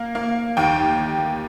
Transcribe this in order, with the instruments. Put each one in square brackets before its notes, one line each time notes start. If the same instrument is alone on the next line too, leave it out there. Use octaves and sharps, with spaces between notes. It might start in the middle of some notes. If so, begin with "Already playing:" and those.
Already playing: [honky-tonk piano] A#3 F5
A#3 F5
D#2 G5